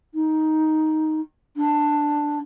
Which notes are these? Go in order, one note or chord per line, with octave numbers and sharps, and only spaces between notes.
D#4
D4